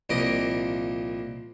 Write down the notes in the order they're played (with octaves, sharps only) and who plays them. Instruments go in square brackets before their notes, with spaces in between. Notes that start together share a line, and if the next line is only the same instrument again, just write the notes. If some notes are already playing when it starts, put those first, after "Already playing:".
[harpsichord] C2 A#2 F3 D#5 D6